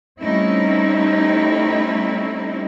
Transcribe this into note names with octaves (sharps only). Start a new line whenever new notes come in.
G3 A3 C4 C#4 D#4 E4